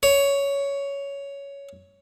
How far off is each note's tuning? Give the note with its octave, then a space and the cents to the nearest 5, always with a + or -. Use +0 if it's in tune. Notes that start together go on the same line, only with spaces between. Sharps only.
C#5 +10